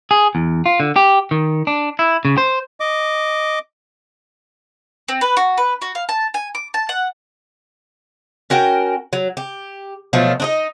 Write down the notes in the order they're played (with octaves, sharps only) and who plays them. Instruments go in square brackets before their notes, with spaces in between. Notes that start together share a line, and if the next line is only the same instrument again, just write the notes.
[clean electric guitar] G#4
E2
F4
D3
G4
D#3
D4
E4
C#3
C5
[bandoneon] D#5 D6
[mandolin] C4
B4
F#4
B4
F#4
F5
A5
G#5
D6
A5
F#5
[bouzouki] C#4 F#4 A#4 G5
F#3
G4
B2 F3 F#3 A3
D4 D#4 D#5